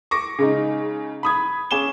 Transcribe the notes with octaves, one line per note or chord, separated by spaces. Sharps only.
C#6 D6 A#6
C#3 G#3 D#4
B5 D#6 G#6
C#4 G#4 D6 E7 G7